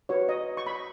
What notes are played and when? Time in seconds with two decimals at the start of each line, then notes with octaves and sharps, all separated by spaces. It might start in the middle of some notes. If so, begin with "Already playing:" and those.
0.09 F#4 B4 C#5
0.29 D#5
0.57 C#6
0.67 B5